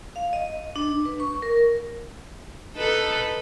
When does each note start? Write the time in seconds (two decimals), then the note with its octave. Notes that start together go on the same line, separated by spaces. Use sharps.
0.16 F5
0.33 D#5
0.76 D4
1.05 B4
1.20 C#6
1.42 A#4
2.76 D#4 A4 B4